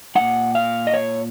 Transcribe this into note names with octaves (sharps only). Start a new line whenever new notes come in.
A#2 G#3 F#5
F5
D#5
C#5